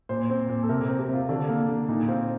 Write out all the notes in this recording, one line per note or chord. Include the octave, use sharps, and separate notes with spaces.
A#2 C5
C4
A#2
A4
C3 A#4
C4
G4
C3 F4
D3 D4
A#3
D3
A#2 D#4
C4 F4